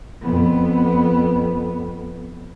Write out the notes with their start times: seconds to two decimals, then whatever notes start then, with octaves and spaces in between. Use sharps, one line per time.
0.22 F2 B3